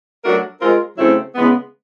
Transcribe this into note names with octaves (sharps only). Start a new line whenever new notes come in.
F#3 A3 D4 F#4 A#4
G#3 C4 F4 A#4
C#3 F#3 A3 C4 E4
C#3 E3 G#3 B3